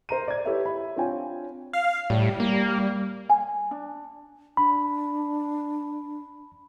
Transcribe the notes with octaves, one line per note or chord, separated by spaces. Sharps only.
A#4 C5 A#5 D#7
D5 G#6
E4 G4 A4 B4 C#5 E5
E5 B5
C4 D4 F4 C#5 G5 G#5
F5
A2 G3
A#3
G#5
D4
D4 B5